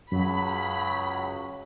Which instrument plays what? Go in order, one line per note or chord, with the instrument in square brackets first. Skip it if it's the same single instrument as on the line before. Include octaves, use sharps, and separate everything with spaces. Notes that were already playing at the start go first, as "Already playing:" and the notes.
[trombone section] C#2 C#3 F#3 [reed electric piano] F#2 [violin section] B5